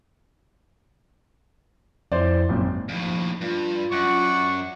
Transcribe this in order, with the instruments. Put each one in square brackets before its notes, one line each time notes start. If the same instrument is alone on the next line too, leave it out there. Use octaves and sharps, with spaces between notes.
[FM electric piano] F2 E4 [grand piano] C5 D5
[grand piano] G#1 [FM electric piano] F#2 A#2 F#3
[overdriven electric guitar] D#2 A2 [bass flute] F3
[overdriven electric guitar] G2 [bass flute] F4
[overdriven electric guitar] F#2 [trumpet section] D5 F#5 C#6